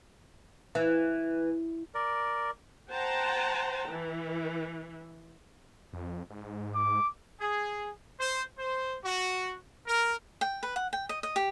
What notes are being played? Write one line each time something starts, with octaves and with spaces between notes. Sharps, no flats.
E3
A#4 D5
C5 F#5 G5 A5 A#5
E3
F2
G#2
D6
G#4
C5
C5
F#4
A#4
G5
B4
F#5
G5
D#5
D#5
G4